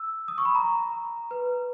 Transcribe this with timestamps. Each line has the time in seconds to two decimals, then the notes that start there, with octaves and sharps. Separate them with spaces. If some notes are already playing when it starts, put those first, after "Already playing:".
Already playing: E6
0.28 D#6
0.38 C#6
0.45 B5
0.55 A#5
1.31 B4